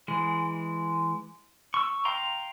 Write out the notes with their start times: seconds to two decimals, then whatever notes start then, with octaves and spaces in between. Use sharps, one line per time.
0.08 E3 G#3
1.74 C#6 E6
2.05 F5 G5 A#5 C6